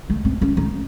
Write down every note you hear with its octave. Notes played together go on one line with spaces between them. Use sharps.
A3
C4
C#4
D#4